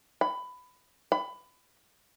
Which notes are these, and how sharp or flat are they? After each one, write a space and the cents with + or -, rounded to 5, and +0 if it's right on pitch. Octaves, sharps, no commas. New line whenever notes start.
B5 +15
B5 +20